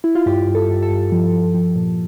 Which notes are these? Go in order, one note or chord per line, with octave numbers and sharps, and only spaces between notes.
E4
F4
G2 G4
G2
A4
G2
A4
G2
F3
F3
F3
A#2